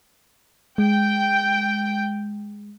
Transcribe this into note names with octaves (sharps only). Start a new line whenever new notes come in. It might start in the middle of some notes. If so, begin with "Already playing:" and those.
G#3 G5